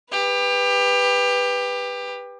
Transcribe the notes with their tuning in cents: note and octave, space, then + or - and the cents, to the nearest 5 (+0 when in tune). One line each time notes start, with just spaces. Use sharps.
G4 +25 B4 +0